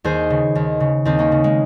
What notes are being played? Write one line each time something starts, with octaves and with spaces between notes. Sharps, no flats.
D#2 G#4 C5
C#3
D#2
C#3
D#2 C4 D#4
A#3 C#4
C#3
G#3